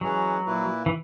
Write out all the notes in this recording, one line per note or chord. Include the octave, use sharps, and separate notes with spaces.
E3 F#3 G#3 C#4 G#4 B4
A#2 A#3 E4 B4
E3